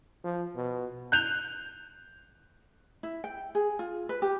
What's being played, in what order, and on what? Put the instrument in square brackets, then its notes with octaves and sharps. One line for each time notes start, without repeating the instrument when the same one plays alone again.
[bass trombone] F3
B2
[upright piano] F#6 G6 F7
[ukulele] E4
G5
G#4
F4
B4
G4